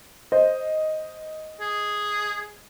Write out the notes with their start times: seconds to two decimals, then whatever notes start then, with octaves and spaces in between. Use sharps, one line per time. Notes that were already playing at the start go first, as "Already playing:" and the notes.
0.32 C5 D#5
1.61 G#4